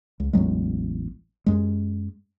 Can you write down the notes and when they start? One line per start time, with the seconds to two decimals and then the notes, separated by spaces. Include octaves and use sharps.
0.20 C#2
0.33 A1 E2 F#3 G#3
1.46 F#2 G#3